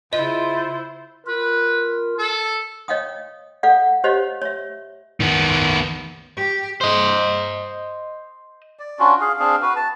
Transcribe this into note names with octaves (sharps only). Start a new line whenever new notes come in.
C#3 E4 F4 C5 D#5
F4 A#4 B4
A4
C#5 D#5 F5 G5 D#6
A4 D5 F5 F#5
G4 C5 C#5 D#5 F5
C#5 E5
D#3 B3
G4
C5 D#5
D5
C#4 D4 F4 F#4
G#4 F5
C4 D4 G#4 F5
F#4 B4
A5